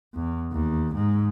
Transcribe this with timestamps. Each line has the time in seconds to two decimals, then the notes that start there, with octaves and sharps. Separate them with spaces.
0.14 E2
0.52 D#2
0.94 G#2